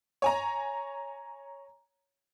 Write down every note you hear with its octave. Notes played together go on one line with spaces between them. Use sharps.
C#5 G#5 A#5